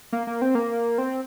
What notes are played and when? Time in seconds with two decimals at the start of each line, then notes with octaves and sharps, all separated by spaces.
0.12 A#3
0.27 A#3
0.42 C4
0.55 A#3
0.98 C4